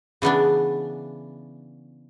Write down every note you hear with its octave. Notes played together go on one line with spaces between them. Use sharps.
C#3 E3 B3 D4